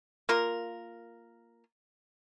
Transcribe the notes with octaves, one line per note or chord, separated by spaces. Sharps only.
A#3 F4 A#4